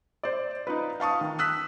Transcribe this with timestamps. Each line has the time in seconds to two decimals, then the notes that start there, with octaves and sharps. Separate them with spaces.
0.23 C5 D5
0.67 D#4 F4 B4
1.00 F5 A5 C#6 D#6
1.21 D#3
1.39 D#6 E6 F#6 B6